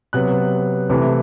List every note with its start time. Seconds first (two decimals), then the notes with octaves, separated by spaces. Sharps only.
0.13 C3 F#3 B3 F#6
0.90 C3 E3 A3